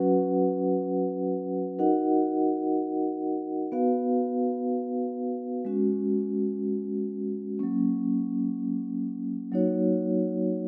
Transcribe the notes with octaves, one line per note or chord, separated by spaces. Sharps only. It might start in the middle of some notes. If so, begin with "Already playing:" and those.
Already playing: F#3 C#4 F#4 B4 F#5
D#4 F#4 A#4 D#5 F#5
B3 F#4 B4 F5
G#3 C#4 F#4
F#3 A#3 C#4
F#3 A#3 D#4 F#4 C#5